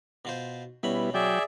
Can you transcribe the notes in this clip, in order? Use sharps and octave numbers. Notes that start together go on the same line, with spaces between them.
B2 F4 C5
B2 G3 B3 C#4 E4 B5
F#3 G#4 D5 E5 G5